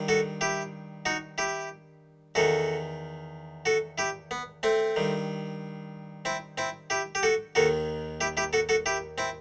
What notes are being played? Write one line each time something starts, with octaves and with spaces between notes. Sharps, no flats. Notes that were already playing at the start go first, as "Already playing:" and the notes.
Already playing: G2 D#3
F#4 A4
E4 G4
D#4 F#4
E4 G4
E2 D#3 F#4 A4
F#4 A4
E4 G4
B3
A3 C4
G2 D#3
C4 E4
C4 E4
E4 G4
G4
F#4 A4
D#2 D#3 F#4 A4
E4 G4
E4 G4
F#4 A4
F#4 A4
E4 G4
C4 E4